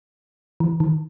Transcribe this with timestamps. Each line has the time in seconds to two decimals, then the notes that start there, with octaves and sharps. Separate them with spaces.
0.60 E3
0.80 D#3